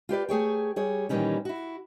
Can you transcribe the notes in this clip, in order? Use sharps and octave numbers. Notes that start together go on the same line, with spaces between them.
F4 G4 B4 D5
A3 G#4 C#5 G5
G3 G#4 C#5
A#2 D#3 E3 G3 C#4 D#4
E4 F#4